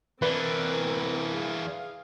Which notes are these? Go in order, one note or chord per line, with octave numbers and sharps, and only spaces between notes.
E3 C4 D4 A#4 B4
G#4 F5